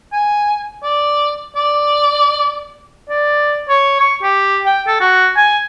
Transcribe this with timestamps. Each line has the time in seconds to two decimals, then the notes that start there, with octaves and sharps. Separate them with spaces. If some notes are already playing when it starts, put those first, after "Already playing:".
0.13 G#5
0.83 D5
1.56 D5
3.09 D5
3.69 C#5
4.00 C#6
4.23 G4
4.66 G5
4.87 A4
5.01 F#4
5.37 G#5